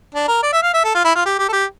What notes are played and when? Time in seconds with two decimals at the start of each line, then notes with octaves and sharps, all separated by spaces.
0.14 D4
0.28 A#4
0.42 D5
0.53 E5
0.63 F5
0.74 E5
0.84 A4
0.95 F4
1.04 E4
1.15 F4
1.25 G4
1.39 G4
1.48 A4
1.52 G4